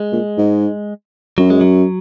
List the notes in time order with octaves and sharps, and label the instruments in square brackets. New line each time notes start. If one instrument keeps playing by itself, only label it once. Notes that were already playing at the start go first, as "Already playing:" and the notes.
Already playing: [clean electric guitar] G#3
[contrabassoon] A#2
G#2
[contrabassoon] F#2 [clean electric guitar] F#3
[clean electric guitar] G#3
F#3